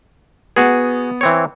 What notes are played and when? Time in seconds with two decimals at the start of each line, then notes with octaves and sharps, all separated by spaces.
0.56 B3 F#4 G#4
1.21 E3 C4 C#5